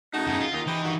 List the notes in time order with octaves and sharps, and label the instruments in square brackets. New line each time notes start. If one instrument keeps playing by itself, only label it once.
[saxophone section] C#3 A3 D#4 [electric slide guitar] F#4
[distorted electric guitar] E2 G2 [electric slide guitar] F#4 G#4
[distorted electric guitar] F4
[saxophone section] D#2 [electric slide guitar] D#4 D#5
[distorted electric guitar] E3 [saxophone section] G4 B4 C5
[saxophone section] G2 D#3 F#4